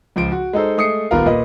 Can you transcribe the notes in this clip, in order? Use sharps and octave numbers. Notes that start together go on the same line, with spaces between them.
C#2 F3 D7
F#4
G#3 D#4 A4 C5
G#3 A3 D#6 C7 C#7
D#1 B3 F4 A#4 F5
A#2 B4 D#5